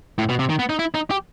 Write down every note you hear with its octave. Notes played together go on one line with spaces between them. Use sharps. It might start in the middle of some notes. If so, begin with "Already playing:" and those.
A2
B2
C3
D#3
B3
D#4
E4
D#4
G4